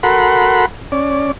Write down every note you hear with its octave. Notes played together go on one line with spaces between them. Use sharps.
F#4 A4 A#4 F#5 B5 C6
C#4 D5